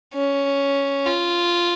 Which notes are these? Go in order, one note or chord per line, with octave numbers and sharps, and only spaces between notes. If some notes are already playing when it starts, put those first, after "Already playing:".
C#4
F4